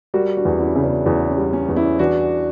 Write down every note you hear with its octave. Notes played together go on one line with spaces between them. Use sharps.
G3 F#4 A#4
D4 F#4
E2
C#4 E4
C#3
B3 D4
E2 B3
C#4
G3
C#4
E2
C#4 E4
E3 D4 F#4